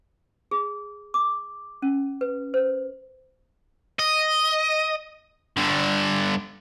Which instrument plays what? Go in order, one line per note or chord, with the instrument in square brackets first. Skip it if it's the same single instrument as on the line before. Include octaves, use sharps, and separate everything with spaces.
[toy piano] G#4
D6
C#4
B4
C5
[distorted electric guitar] D#5
G2 D3